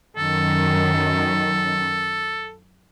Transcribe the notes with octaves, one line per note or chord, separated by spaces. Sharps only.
F#2 D#3 A4